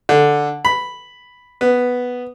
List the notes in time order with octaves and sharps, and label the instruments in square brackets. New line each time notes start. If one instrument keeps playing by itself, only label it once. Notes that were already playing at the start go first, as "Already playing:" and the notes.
[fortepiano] D3
B5
B3